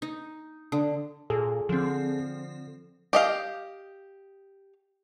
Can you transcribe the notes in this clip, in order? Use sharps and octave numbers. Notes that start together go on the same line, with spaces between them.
D#4
D3
A#2 G#4 A4
D3 F3 C4
G4 D#5 F5